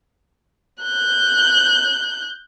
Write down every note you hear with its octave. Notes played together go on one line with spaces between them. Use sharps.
F#6 G6